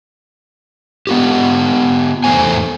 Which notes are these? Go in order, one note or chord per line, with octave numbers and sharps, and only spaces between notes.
B3 F4 G4
E2 G#2 A3 C5 G#5